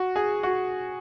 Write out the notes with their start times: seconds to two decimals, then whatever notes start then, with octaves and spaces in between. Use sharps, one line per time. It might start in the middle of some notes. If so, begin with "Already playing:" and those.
Already playing: F#4
0.16 G#4
0.43 F#4